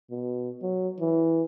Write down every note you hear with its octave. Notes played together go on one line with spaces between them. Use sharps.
B2
F#3
E3